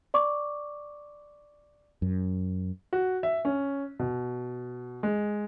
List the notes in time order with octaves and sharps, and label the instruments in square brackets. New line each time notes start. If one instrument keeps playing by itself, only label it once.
[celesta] D5 C#6 D6
[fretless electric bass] F#2
[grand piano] F#4
E5
C#4
B2
G#3